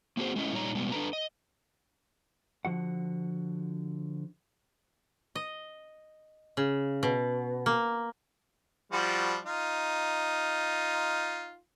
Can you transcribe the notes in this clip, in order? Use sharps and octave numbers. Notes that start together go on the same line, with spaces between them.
A#3 C4 F#4 G#4 C5
G#3 A3 C#4 E4 D#5
A#2 G3 D#4 C#5 A#5
B2 G3 G#3 B3
D4 A4 B4 A#5
D#5
D3 F3 F#4 F#5
D#5
C#3
B2
A#3
F3 G3 F#4
D#4 F4